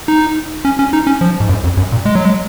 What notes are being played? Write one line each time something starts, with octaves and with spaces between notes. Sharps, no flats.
D#4
C#4
C#4
D#4
C#4
F3
G#2
F#2
F2
F#2
A#2
G#3
F#3
G#3